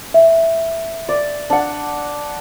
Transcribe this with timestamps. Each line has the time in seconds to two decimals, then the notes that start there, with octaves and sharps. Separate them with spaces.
0.14 E5
1.09 D5
1.50 D4 F#5